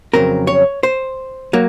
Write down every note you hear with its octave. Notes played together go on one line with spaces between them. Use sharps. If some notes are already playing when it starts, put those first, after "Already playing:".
F2 C#3 F#3 C4 A#4
C#5
C5
F#3 A#3